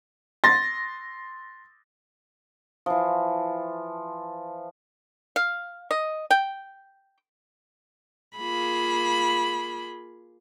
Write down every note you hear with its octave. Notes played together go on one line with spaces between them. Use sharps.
C6 A6 A#6
E3 F3
F5
D#5
G5
A#3 F4 G#4 B5